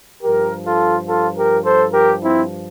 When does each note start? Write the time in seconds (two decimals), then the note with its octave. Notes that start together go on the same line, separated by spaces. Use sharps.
0.23 G2 F3 G4 A#4
0.65 F4 A4
1.08 F4 A4
1.36 G4 A#4
1.65 A4 C5
1.93 G4 A#4
2.22 C4 E4